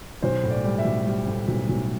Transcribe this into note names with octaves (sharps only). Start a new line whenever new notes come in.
B1 C5
A2
D5
G3
E5
B1
G3
A2
B1
B1